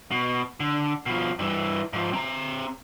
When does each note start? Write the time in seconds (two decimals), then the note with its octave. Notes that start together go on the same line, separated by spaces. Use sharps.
0.11 B2
0.60 D3
1.06 B2 F3
1.39 G2 E3
1.93 G#2 F3
2.13 C4 A#5